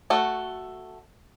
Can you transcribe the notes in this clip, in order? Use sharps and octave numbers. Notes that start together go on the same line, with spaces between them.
A3 F#4 A4 F#5